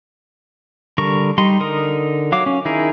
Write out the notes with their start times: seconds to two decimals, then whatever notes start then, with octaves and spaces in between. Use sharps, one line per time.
0.98 D3 G3 A#4 C#6
1.38 G3 D#4 C6
1.60 D3 D#4 A#4 D#6
2.32 F#3 F5 D6
2.46 C#4
2.65 D#3 D#4 E4 G#4 A#4